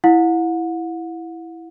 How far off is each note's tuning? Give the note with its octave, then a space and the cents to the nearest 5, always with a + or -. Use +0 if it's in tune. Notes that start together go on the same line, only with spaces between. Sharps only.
E4 +0 F#5 -35